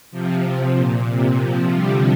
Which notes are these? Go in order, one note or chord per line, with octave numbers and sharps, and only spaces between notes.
C3 F3
C3
A#2
C3
C3 F3
D3 G3